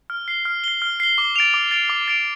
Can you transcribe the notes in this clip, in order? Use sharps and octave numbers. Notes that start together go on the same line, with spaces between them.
F6
C7 G7
F6
C7 G7
F6
C7 G7
D6
A6 D7 F7
D6
A6 D7 F7
D6
A6 D7 F7